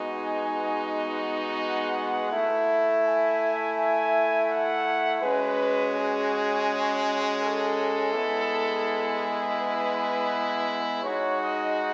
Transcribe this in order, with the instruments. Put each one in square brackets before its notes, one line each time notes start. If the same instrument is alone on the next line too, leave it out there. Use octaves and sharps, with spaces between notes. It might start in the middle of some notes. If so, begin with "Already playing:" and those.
Already playing: [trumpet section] G#3 B3 D#4 F#4
G#5
F#5
A3 E4
G#5
G#5
F#5
G#3 C#4 F#4 B4
G#4
A4
G#3 B3 E4
B4
G#3 D#4 F#4 C#5
D#5